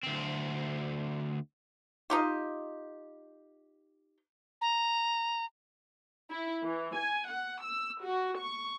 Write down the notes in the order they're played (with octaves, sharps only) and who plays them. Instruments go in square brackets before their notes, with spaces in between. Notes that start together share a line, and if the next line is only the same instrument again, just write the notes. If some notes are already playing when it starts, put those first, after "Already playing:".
[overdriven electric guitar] D2 C4
[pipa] D#4 F4 G4
[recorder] A#5
[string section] E4
E3
G#5
F#5
E6
F#4
C#6